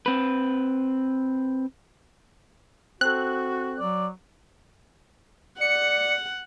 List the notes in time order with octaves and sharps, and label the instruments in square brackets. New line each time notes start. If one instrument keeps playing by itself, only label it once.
[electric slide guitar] C4 B4
[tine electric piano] C4 A4 [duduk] F#4 [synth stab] F#6
[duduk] F#3 [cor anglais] D5
[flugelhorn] D5 [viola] F#5 [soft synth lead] C#7